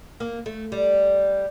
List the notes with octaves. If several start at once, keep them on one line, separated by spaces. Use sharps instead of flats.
A#3
A3
G3